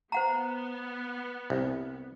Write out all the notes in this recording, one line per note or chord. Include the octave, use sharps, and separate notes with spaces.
B3 C5 F#5 A#5
C2